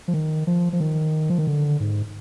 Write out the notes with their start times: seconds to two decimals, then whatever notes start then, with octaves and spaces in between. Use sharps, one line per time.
0.08 F3
0.14 D#3
0.47 F3
0.73 F3
0.80 D#3
1.30 F3
1.38 D#3
1.47 D3
1.80 G#2